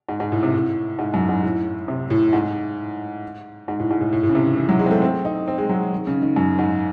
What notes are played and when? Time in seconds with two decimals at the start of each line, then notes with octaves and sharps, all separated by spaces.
0.09 G#2
0.20 G#2
0.32 A2
0.43 C3
0.54 A2
0.99 G#2
1.14 F#2
1.29 G#2
1.43 A2
1.88 C3
2.10 A2
2.33 G#2
3.68 G#2
3.79 A2
3.91 G#2
4.01 A2
4.13 A2
4.23 A2
4.29 C#3
4.35 C3
4.46 D#3
4.57 E3
4.69 F#3
4.79 G#3
4.86 C4
4.91 A3
5.02 C4
5.25 D#4
5.48 C4
5.58 G#3
5.69 F#3
5.92 D#3
6.07 C#3
6.22 D#3
6.36 F#2
6.59 G#2